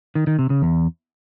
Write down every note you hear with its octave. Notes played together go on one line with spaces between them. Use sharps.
D#3
D#3
C3
C#3
E2